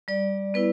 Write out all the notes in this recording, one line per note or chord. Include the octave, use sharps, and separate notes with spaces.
G3 D5
B3 E4 B4